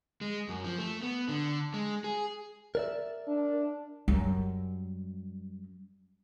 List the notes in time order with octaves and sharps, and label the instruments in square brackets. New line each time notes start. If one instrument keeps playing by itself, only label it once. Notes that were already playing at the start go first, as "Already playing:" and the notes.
[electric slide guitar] G#3
F#2
F3
A3
B3
D3
G#3
G#4
[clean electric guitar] A#4 D5 E5
[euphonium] D4
[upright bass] F#2 G3